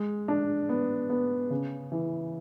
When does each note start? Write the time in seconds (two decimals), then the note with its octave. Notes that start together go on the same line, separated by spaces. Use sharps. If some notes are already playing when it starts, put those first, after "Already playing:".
Already playing: G#3
0.28 D4
0.69 B3
1.10 B3
1.50 C#3
1.92 E3